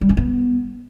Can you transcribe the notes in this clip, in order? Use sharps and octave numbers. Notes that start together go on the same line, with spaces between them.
G3
C#4
B3